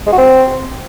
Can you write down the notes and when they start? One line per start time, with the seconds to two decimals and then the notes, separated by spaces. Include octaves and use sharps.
0.07 G#3
0.12 F#4
0.18 C4